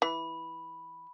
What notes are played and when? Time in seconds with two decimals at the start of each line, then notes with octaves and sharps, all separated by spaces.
0.02 E3 B5